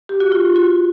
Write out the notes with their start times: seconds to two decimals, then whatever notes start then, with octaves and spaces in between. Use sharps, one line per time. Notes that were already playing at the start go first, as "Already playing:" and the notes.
0.09 G4
0.20 F#4
0.32 F4
0.56 F#4